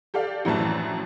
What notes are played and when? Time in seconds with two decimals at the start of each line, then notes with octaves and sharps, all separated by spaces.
0.14 G4 A4 D5 F5
0.45 A#1 F#2 A2 E3 A5